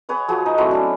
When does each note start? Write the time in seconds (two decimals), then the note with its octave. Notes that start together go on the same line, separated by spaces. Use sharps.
0.09 G#4 B4 C#5 F#5
0.28 F3 F#4 G#4 F#5
0.46 D#4
0.58 F#3 A3 C4 E4
0.71 C#4 D4